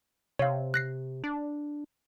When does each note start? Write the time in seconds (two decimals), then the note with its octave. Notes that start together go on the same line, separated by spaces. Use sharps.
0.39 C3 C#5 F5
0.74 F#6 A#6 C7
1.24 D4